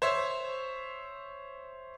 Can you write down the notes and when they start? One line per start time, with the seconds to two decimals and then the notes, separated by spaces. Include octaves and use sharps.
0.02 C5 C#5 E5 G#6